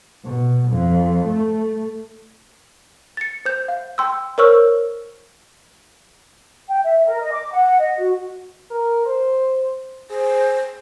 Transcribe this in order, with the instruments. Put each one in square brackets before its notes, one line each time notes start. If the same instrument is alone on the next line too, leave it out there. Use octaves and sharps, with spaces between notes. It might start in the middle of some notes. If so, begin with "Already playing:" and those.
[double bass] B2
F2
A3
[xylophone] A6 C#7
C5 G6
F5
G5 C6 E6
A#4 C5 C#5 C#6 E6 F6
[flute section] G5
E5
A#4
D#5
D6
F#5
D#5
F#4
[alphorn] A#4
C5
[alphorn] G#4 [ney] C5